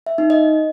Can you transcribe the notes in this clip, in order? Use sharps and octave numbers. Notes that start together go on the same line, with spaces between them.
E5
D#4
D#5